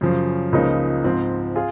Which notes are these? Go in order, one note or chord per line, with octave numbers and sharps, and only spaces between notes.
F#2 C#3 F3
C#2 C#3 F3 A#3 D#4
G#2 F3 C4
F4 G#4